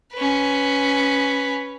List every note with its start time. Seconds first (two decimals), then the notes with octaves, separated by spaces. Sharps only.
0.13 C#4 B4